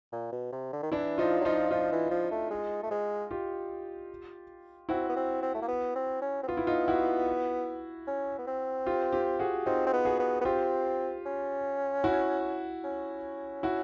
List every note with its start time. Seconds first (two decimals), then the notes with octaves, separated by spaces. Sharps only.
0.12 A#2
0.32 B2
0.52 C3
0.73 D3
0.83 D#3
0.92 E3 D4 E4
1.18 F3 D#4 F4
1.41 F#3
1.45 F3 D#4 F4
1.71 F3 D#4 F4
1.92 E3
2.11 F3
2.31 A3
2.50 G#3
2.83 A3
2.91 G#3
3.31 F4 G4
4.89 C4 E4 F#4
5.09 B3
5.16 C4
5.42 C4
5.54 A3
5.62 A#3
5.68 B3
5.95 C4
6.21 C#4
6.43 C4
6.48 B3 F4
6.57 E4
6.67 D#4 F4
6.88 E4 F#4
8.07 C#4
8.38 B3
8.47 C4
8.86 F4 G4
9.12 F4 G4
9.39 F#4 G#4
9.66 C4 D#4 F4
9.86 C4
9.93 B3
10.05 F#4 G#4
10.19 B3
10.41 B3
10.45 C4 F4 G4
11.26 C#4
12.04 E4 F#4
12.84 C#4
13.63 E4 F#4